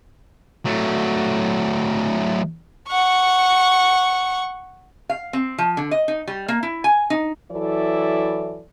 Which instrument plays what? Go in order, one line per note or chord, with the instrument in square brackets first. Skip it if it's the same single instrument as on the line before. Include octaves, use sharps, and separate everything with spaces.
[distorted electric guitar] F#3 A3
[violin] F#5 C#6
[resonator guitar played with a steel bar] F5
C4
F3
D3
D#5
D#4
G3
A#3
E4
G#5
D#4
[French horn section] E3 F#3 E4 A4 D5